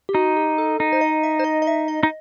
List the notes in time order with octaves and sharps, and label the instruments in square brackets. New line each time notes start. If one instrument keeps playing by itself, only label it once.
[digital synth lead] G4
[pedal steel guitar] D#4 [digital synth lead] F#4
[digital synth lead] G4
A4
[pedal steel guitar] D#4
[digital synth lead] C5
D#5
E5
C5
D#5
D#5
E5
D#5
[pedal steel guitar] D#4